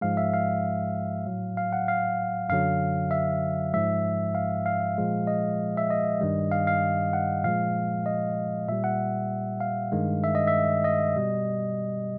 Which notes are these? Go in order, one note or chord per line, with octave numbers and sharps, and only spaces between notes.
G#2 F3 G#3 F5
E5
F5
A2 F#3
F5
F#5
F5
F#2 D3 F#3 F5
E5
G#2 F3 G#3 E5
F5
F5
A#2 F3 G#3
D#5
E5
D#5
G2 D#3 G3
F5
F5
F#5
A#2 F3 G#3 F5
D#5
A#2 G3 E5
F#5
F5
G2 D#3 G#3
E5
D#5
E5
D#5
B2 G3